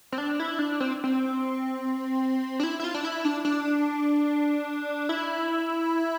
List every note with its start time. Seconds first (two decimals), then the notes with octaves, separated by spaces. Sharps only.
0.12 C4
0.18 D4
0.40 E4
0.59 D4
0.80 C4
1.04 C4
2.60 D4
2.63 E4
2.80 E4
2.84 F4
2.94 D4
3.05 E4
3.25 D4
3.45 D4
5.09 E4